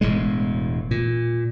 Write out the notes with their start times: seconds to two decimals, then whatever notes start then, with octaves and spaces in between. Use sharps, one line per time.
0.01 E1 E2 A2 G#3
0.91 A#2